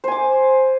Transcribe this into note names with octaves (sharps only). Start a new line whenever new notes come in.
C5 G#5 D6